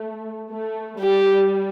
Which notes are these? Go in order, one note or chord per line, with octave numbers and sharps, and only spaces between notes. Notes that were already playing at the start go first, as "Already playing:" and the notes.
Already playing: A3
A3
G3 G4